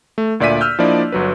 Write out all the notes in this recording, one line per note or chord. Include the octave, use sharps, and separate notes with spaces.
A3
D2 A#2 D5 E5 B6 D#7
E6 F6 G6
F3 A#3 D4 E4 D5 D#5
G1 F#3 B4